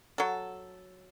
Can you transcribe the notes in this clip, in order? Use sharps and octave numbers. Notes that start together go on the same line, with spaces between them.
F#3 A4